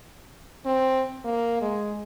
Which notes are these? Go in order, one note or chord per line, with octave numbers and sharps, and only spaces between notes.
C4
A#3
G#3